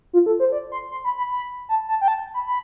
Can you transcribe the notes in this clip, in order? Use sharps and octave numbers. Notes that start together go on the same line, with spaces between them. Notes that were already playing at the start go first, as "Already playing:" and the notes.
F4
A4
C5
D5
C6
C6
B5
B5
B5
A5
A5
G5
A5
B5
B5